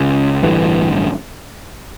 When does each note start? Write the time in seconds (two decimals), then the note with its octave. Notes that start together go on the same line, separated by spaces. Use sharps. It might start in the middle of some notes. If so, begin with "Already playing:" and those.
Already playing: C#2 C#3
0.43 A1 G2 D3 E3